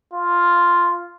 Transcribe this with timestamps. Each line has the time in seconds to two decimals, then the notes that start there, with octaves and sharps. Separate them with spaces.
0.13 F4